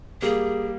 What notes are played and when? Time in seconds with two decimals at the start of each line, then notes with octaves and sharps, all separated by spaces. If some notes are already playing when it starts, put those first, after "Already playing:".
0.22 G3 A#3 G#4